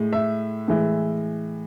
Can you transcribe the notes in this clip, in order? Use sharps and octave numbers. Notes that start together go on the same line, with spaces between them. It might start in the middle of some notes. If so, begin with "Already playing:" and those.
Already playing: A2 G#3
E5
A2 E3 G#3